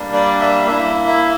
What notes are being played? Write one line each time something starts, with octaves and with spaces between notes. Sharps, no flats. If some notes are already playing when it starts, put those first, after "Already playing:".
Already playing: G3 A#3 D4
D5
E5
A#3 E4 E5
E5